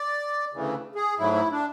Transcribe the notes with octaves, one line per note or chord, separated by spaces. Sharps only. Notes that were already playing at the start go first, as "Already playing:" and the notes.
Already playing: D5
D2 C#3 E3 A3
G#4
G#2 F#3 A3 E4
E4
D4